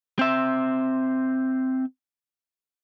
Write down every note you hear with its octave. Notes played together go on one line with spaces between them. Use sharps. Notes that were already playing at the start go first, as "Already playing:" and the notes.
C4 E5